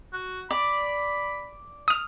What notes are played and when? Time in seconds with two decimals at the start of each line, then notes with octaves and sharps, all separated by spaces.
0.13 F#4
0.51 D5 B5
1.88 D#6 F6